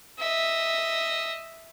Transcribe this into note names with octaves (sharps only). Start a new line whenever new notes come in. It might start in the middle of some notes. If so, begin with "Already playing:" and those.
D#5 E5